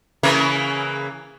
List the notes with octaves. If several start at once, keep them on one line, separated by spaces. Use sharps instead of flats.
C#3 E3 A#3